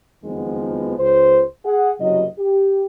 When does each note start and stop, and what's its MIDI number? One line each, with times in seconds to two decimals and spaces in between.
0.24 0.94 30
0.24 0.94 41
0.24 0.94 51
0.24 0.94 53
0.24 0.94 56
0.24 0.94 59
0.97 1.42 37
0.97 1.42 72
1.65 1.90 68
1.65 1.90 78
2.00 2.24 30
2.00 2.24 36
2.00 2.24 54
2.00 2.24 75
2.38 2.86 67